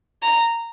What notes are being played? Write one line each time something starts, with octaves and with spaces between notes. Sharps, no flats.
A#5